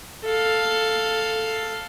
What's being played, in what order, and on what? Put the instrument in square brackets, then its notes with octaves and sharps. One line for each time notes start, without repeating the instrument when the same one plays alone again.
[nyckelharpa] A4 F5